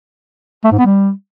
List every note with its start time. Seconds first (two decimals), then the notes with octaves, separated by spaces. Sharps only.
0.64 A3
0.71 G#2
0.78 B3
0.86 G3